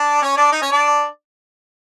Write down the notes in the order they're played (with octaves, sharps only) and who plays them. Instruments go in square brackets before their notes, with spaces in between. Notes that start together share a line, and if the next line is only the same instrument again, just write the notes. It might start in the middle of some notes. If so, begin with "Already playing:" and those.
Already playing: [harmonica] D4 D5
C#4 C#5
D4 D5
D#4 D#5
C#4 C#5
D4 D5